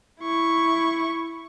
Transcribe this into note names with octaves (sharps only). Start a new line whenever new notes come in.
E4 C#6